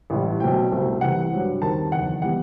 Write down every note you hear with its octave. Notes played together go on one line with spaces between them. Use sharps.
A1 A2 G3
B1 B2 A3 C4 G5
C2 B2 A3 C4
C2 C3 E3 F#5
G2 F#3 C4
D#2 D#3 G3 C4 A5
F#1 E2 D#3 F#5
E3 G3 B3 F#5